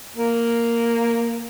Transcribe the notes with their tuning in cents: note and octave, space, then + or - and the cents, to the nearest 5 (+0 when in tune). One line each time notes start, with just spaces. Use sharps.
A#3 -5